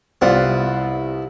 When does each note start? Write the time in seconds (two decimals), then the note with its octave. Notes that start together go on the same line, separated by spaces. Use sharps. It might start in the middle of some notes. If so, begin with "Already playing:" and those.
0.22 C2 B3 C4 E4 F4 D5 F#5